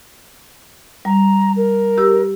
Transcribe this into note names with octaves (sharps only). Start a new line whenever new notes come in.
G3 A#5
A#4
G4 E6